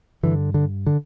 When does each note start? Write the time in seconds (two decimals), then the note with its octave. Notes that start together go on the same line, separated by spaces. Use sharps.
0.23 G2 D3 E3
0.54 D3
0.87 D3